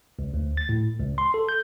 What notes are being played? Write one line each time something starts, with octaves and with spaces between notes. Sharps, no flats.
C#2
D2
A6
A2
C#2
C6
A4
G6